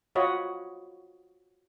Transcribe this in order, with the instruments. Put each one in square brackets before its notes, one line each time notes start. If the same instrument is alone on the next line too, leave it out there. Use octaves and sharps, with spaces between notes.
[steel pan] F4 F#4 C#5 D#5 B5